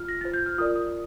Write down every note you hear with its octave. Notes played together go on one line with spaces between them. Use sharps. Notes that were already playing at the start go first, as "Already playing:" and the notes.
Already playing: F4 F6
A#6
F4 C5 A6
G6
F6
F4 A#4 D5 D#6
D#6